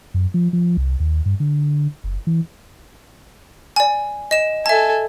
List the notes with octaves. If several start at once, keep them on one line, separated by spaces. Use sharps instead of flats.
F#2
F3
F3
C2
D#2
G2
D3
F#1
E3
D5 G#5
D#5 E7
A4 E5 G#5 A5